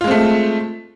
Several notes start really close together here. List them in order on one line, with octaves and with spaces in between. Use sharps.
F4 G#3 C4 A3